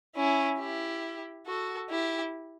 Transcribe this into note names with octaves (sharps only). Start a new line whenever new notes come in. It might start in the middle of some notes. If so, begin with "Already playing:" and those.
C#4 E4
E4 G4
F#4 A4
E4 G4